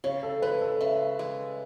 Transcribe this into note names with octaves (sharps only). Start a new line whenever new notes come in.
C#3 C#5
A4
G#3 B4
A4
C#3 E5
G#3